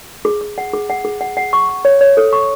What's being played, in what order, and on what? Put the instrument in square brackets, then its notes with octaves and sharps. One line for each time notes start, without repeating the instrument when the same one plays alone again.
[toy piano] G#4
G#4
F#5
G#4
F#5
G#4
F#5
F#5
C#6
C#6
C#5
C#5
A4
C#6